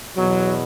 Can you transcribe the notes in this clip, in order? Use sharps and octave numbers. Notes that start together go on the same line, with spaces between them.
E2 B2 F#3